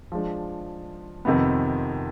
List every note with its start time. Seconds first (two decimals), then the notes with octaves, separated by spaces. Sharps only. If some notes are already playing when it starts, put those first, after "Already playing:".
0.12 F3 G#3 D4
1.25 F2 C3 D#3 B3